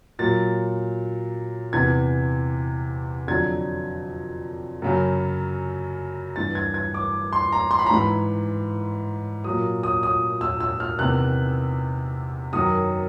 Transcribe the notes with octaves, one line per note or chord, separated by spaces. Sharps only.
A#2 F#3 A6
E2 C3 E3 G#6
F2 D3 F#3 G#6
F#2 C#3 F#3
G2 E3 A6
G#6
G#6
D6
C6
A#5
C6
B5
A#5
G#2 E3 B5
A#2 F#3 D#6
D#6
D#6
E6
E6
F6
E2 C3 D#3 F#6
F#2 D#3 F#3 D#6